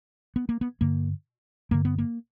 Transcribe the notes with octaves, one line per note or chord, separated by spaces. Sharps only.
B3
A#3
B3
G2 D3 A#3
G2 D3 A#3
B3
A#3